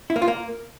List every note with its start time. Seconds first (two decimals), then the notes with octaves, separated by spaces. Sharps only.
0.10 E4
0.16 A#3
0.22 F4
0.28 A#3